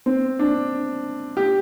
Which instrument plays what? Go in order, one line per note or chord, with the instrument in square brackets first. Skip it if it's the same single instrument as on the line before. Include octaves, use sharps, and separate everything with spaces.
[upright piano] C4
D4
G4